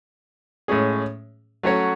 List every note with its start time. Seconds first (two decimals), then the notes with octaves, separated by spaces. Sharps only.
0.68 A2 G#3 C#4 G#4
1.63 F#3 A3 C#4 F#4 C#5